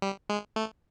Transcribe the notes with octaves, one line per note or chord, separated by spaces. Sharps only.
G3
G#3
A3